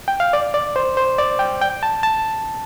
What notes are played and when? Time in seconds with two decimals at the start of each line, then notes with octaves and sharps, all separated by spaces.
0.08 G5
0.20 F5
0.33 D5
0.54 D5
0.76 C5
0.97 C5
1.18 D5
1.39 G5
1.62 G5
1.83 A5
2.03 A5